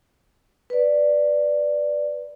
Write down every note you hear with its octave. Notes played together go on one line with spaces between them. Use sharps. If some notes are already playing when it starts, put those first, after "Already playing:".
B4 D5